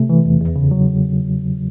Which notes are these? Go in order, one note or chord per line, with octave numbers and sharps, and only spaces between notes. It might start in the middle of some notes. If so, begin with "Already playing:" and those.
Already playing: C3 A3
E3
E2
E2
C#3
F#3